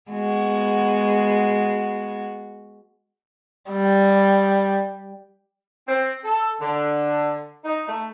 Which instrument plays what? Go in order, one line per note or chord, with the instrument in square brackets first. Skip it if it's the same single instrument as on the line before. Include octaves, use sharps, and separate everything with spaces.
[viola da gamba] G#3 B3 F#4
[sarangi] G3
[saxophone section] C4
A4
D3
D#4
A3